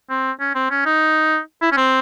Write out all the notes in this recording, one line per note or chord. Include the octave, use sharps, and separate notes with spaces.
C4
C#4
C4
C#4
D#4
E4
C#4
C4